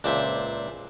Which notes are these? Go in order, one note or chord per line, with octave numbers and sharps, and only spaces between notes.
C#2 A#2 D4 C5 E5